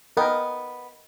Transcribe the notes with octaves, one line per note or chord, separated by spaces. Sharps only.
B3 A#4 D#5 G5